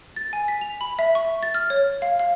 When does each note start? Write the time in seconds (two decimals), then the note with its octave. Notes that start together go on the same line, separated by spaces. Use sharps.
0.16 A6
0.33 G#5
0.48 B6
0.61 F7
0.81 B5
0.99 E5
1.15 C#6
1.43 A6
1.55 F6
1.70 C#5
2.02 F5
2.19 F5